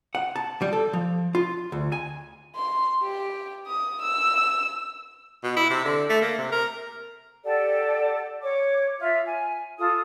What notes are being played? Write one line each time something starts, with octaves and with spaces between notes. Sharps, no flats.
F#5
A5
G3
A4
F3
F4
D2
G#5
C6
G4
D#6
E6
B2
E4
C3
D3
A3
A#3
C3
A#4
G4 A4 D5 F#5
C#5 D6
F4 E5
G#5
F4 A4 D#6